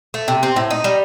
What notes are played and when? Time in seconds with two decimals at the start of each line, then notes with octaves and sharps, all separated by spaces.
0.14 A3
0.28 C3
0.43 C4
0.56 A2
0.71 D#4
0.84 G3